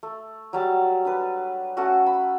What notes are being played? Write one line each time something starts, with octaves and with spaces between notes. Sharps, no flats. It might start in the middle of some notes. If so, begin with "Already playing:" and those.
A3
F#3 G3 A5
D4 B4
A3 C#4 F#4
B5